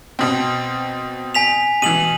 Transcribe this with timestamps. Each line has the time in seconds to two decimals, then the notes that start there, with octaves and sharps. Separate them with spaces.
0.19 B2 C4
1.35 G#5 B6 F7
1.82 B2 E3 D#7 F#7